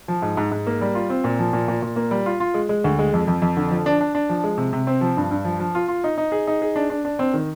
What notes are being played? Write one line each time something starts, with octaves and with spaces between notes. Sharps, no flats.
F3
G#2
G#2
G#2
A#3
G3
F4
C4
A#2
F3
A#2
A#2
A#2
A#3
G3
F4
F4
G#3
G#3
D2
G#3
F2
F2
F2
D3
F3
D4
D4
D4
F3
G#3
C3
C3
C4
F3
G2
G2
F3
F3
F4
F4
D#4
D#4
G#4
D#4
G#4
D4
D4
D4
C4
D#3